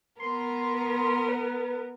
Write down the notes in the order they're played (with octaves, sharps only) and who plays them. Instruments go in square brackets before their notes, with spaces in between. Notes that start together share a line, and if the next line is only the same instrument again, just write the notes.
[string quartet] B3 A#4 [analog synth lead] C6
[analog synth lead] B4